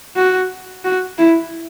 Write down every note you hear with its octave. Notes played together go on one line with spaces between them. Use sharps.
F#4
F#4
E4